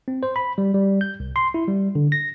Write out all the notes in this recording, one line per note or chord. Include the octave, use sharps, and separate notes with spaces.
C4
C5
B5
G3
G3
G6
C2
C6
E4
G3
D3
A#6